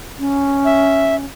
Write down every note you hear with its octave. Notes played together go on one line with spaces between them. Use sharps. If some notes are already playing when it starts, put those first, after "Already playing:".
C#4
E5